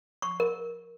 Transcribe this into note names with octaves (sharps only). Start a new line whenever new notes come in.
C#6
A#4